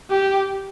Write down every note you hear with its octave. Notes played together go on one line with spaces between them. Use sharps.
G4